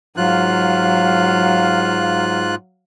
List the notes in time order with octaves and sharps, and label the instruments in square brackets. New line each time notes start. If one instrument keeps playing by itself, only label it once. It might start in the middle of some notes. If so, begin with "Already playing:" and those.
[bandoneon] G#2 F4 F#6 [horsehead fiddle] F#3 F5